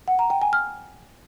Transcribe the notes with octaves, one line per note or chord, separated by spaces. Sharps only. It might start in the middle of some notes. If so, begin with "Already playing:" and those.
F#5
A#5
G5
G#5
F6